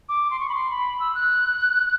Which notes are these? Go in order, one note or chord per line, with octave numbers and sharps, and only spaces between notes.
D6
C6
C#6
B5
C6
B5
E6
F#6